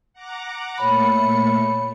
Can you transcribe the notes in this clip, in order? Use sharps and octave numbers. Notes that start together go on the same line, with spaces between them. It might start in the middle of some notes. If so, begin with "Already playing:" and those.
F#5 A#5 D6
A#2 A3 C#5 B5 C#7